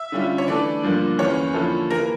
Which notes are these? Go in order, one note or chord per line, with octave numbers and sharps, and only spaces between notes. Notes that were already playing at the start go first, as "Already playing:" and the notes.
Already playing: E5
D3 G3 C#4 F4
C#5
E3 A3 D4 A4 D5
G2 D3 F3 A#3
E2 E3 A#3 C#4 C#5
D3 F3 A#3 E4 A4
E3 A#3 A#4